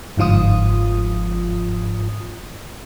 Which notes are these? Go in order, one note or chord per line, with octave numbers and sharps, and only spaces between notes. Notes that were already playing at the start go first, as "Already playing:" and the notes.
G1 G#2 F3 F4 D#6